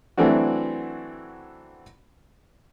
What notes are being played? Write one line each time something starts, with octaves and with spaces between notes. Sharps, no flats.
E3 F#3 A3 C4 D4 F#4